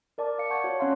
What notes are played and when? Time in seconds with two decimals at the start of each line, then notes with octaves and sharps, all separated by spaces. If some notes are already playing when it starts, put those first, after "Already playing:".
0.18 A#4 D5 A5 D6
0.38 D5 F5 C#7
0.50 F#5 A5 C#6 G6 G#6
0.64 F#4 C#5
0.79 C#4 C#5 F5 F#5 C6